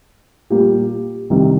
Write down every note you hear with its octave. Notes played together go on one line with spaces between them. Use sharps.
A#2 G3 A#3 G4
C2 C3 D#3